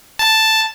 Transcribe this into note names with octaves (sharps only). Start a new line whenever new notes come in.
A5